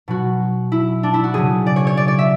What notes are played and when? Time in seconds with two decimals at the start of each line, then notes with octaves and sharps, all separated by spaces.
0.08 B2 F#3 F#4
0.72 E4
1.03 D4
1.14 E4
1.24 F#4
1.34 C#3 F#3 G#4
1.66 D5
1.76 C#5
1.87 C#5
1.97 D5
2.08 D5
2.19 E5